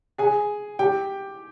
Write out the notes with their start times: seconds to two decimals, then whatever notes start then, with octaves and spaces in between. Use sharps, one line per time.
0.18 G#4 G#5
0.79 G4 G5